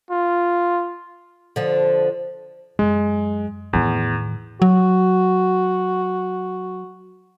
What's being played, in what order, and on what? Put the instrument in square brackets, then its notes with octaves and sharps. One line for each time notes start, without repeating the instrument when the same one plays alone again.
[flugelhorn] F4
[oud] D3 F3
[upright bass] F#2 [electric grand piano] G#3
[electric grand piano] E2 [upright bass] A2 D#3
[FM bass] F#3 [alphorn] F#4